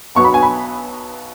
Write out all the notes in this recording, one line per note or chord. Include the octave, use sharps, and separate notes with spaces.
B1 B2 F#3 B3 C#6
B5
G#5
B5